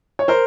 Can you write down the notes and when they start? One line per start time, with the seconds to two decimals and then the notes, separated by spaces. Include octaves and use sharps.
0.19 C#5
0.28 A#4 C5